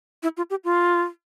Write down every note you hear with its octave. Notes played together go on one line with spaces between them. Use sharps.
E4
F4
G4
F4